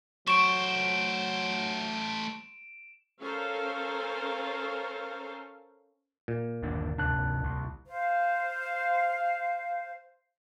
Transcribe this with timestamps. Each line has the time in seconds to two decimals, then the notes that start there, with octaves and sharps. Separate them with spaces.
0.28 F#3 A3 C5 C#6 D7 E7
3.20 C#4 A4 A#4 C5 F5
6.28 A#2
6.63 G1 D#2 D4
6.98 G1 D2 C3 D4 A5 F#6
7.44 C2
7.86 C5 F5